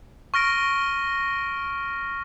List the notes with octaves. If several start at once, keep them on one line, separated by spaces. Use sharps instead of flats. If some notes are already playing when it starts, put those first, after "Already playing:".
C#6 F6 A#6 D7